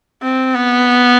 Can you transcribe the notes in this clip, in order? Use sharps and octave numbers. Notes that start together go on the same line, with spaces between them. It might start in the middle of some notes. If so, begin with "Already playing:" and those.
C4
B3